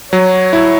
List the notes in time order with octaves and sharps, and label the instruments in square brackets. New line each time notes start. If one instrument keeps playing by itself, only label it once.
[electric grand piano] F#3 [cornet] C#5
[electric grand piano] E4